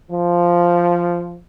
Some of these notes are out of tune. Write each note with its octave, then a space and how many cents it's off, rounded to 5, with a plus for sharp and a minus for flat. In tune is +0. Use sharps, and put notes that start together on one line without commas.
F3 -5